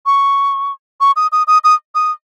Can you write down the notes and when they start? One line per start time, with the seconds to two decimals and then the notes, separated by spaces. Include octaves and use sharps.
0.06 C#6
1.01 C#6
1.16 D#6
1.32 D#6
1.47 D#6
1.64 D#6
1.95 D#6